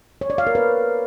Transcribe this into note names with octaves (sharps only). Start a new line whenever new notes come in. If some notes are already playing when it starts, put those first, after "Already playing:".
C#5
D5
F5
A#4
B4